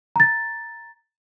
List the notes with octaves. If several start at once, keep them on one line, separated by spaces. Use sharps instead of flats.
A#5 A6